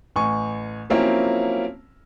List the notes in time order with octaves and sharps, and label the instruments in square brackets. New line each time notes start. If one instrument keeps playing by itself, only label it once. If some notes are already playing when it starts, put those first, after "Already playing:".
[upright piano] A1 G#5 C#6
F3 F#3 A#3 C4 C#4 E4